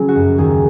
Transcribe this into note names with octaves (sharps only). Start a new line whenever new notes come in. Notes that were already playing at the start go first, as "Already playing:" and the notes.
Already playing: C#3 F#3 G#4
F#4
F#2
D#2 G#4